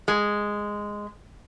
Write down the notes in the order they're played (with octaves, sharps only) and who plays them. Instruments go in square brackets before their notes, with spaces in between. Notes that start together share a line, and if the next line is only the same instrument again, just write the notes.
[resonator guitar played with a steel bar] G#3